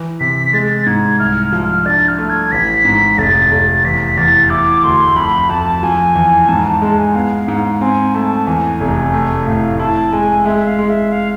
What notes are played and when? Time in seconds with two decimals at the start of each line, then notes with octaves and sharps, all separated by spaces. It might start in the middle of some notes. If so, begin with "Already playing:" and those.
Already playing: E3
0.20 C3 B6
0.53 G#3 A6
0.86 G#2 G#6
1.19 C2 F6
1.52 F3
1.64 F6
1.86 D4 A6
2.08 F6
2.18 A3
2.30 G#6
2.52 A1 B6
2.85 G#2
3.18 F1 A6
3.51 F1
3.84 E2 B6
4.17 E2 A6
4.50 E4 D6
4.84 D2 C6
5.16 F2 B5
5.49 F2 A5
5.83 F3 G#5
6.15 E2
6.48 G#2 A5
6.66 A5
6.81 G#3 A5
6.98 G#5
7.15 B3 F5
7.48 G#2 F5
7.81 C4 G#5
8.14 A3 A5
8.47 E2 G#5
8.80 F1
9.13 A3
9.46 A2 F5
9.79 E4 A5
10.13 G#3 G#5
10.45 G#3 E5
10.67 F5
10.79 G#3
10.89 E5
11.12 F5